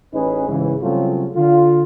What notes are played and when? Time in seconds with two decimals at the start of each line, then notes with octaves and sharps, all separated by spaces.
0.13 A1 C#4 D#4 G#4 B4
0.48 A1 G#2 C#3 E3
0.81 C#3 F#3 G3 A3 C4 F4
1.36 D3 F4